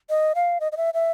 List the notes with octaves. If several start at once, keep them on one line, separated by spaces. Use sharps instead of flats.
D#5
F5
D#5
D#5
E5
E5